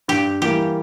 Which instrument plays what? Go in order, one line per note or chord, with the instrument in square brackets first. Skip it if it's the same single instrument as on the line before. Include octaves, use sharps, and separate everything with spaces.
[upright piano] G2 [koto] G4
[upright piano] E3 G3 A#3 [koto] G4